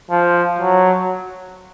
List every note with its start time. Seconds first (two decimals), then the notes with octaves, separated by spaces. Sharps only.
0.11 F3
0.59 F#3